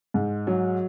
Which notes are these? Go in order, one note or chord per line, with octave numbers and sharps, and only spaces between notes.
G#2
F#3